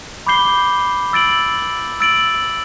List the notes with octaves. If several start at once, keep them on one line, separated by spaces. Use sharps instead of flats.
B5 D6 G6 C7 G7
E6 A6 D7 F#7
E6 A6 D7 F#7